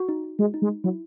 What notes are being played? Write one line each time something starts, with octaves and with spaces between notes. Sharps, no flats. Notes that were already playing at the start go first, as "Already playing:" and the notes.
Already playing: F#4
D#4
D#4
G#3 F#4
D#4
G#3
D#4
F#3 E4